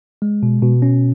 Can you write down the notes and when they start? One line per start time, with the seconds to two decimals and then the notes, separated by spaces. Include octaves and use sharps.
0.22 G#3
0.43 B2
0.62 B2
0.82 C#4